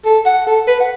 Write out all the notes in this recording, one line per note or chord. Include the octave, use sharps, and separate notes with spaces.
A4
F#5
A4
B4
F#5